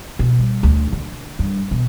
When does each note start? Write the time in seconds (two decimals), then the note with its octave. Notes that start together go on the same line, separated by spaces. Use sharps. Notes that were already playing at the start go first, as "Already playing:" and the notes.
0.19 B2
0.39 G3
0.63 D2
0.92 D3
1.39 G2
1.71 B2